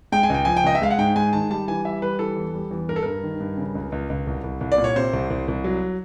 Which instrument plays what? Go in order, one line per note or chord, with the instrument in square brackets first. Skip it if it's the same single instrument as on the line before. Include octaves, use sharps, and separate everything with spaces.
[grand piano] G#3 G5
G#5
C#2 G5
F3 G#5
G5
C#2 D#5
E5
G#3 F5
F#5
G#2 G5
G#3 G#5
D#3 A5
G3 A5
E3 G#5
G3 E5
G3 B4
E3 A4
E2
G3
E2
G2 A#4
A4
G2 A#4
D#3
G2
C#3
C#2
C#2
C#2
C2
C2
C2
D5
A#2
C#5
C3 C5
C2
C2
C2
F#3